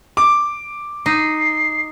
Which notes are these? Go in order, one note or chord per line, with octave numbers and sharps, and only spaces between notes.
D6
D#4 C7